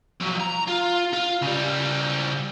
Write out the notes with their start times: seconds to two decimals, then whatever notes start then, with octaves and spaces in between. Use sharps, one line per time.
0.20 F3 F#3
0.40 A#5
0.68 F4
1.13 F4
1.42 C#3 G3